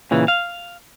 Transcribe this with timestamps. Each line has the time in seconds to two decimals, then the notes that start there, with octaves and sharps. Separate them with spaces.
0.11 A#2 C#3 E3
0.28 F5